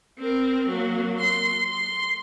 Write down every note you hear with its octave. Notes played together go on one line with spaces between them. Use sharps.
C4 A#4
F#3 A#3
C6
C6